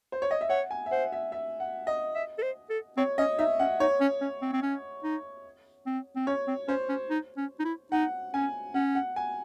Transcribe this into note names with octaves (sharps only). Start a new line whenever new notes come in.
C5
C#5
D#5
E5
C#5 F#5
G#5
E5
C5 F#5
E5
E5
F#5
D#5
E5
A4
C5
A4
C4 C#5
C#4 D#5
D#4 E5
C#4 F#5
D#4 C#5
C#4
C#4
C4
C4
C#4
D#4
C4
C4
C#4 C#5
C4
C#4 C5
C#4
D#4
C#4
D#4
E4
D#4 F#5
C#4 G#5
C#4 F#5
F#5
G#5